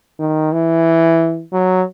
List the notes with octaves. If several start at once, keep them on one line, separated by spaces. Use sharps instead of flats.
D#3
E3
F#3